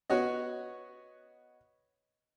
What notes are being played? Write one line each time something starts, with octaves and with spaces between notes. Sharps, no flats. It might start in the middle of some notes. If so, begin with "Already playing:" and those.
B3 F#4 C#5 D#5